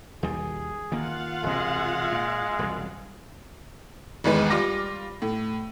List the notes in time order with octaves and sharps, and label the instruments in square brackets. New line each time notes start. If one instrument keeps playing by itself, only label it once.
[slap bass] D#2 B2 G3 [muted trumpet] G#4
[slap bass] D#3 A#3 [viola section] F4 F5 F#5
[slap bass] E1 C3 [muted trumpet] G#3
[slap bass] A#2
E1 C2 F#2
[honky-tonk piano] G#1 E2 G#3 B4
G3 F4 D6 A#6
A2